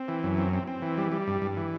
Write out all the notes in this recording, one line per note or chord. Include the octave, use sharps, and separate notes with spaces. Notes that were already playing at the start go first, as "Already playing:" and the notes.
Already playing: C4
E3
F#2
C4
C4
C4
E3
G3
G3
G2
G2
E3